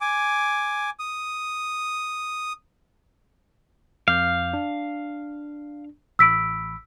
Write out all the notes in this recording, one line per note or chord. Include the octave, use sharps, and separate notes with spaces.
G#5 D6
D#6
F2 F5 D6 G6
D4
A1 B5 E6 B6 D7